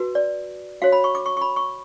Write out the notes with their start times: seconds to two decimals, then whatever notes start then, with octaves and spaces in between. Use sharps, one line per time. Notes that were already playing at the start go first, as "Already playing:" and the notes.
Already playing: F#4 B4
0.15 D5
0.82 F#4 C#5 F5
0.92 B5
1.04 C#6
1.15 D6
1.26 C#6
1.37 C#6
1.41 B5
1.56 C#6